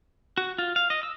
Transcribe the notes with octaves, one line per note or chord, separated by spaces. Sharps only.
F#4
F4
F5
D#5
E6